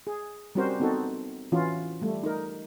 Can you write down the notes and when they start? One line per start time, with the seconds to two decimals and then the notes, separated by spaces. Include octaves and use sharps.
0.07 G#4
0.55 G3 C4 C#4 F#4 A#4 C5
0.80 B3 C4 D#4 F#4 A4
1.52 E3 C#4 F4 F#4
2.02 G3 A3
2.23 D#4 A#4